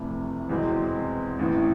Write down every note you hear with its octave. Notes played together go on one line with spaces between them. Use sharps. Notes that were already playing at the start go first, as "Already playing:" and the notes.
Already playing: F1 F2 C3 E3 A3
E2 B2 G#3 C4
A1 A2 E3